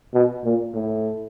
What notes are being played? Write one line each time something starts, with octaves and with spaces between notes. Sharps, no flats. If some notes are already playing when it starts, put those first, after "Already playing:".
B2
A#2
A2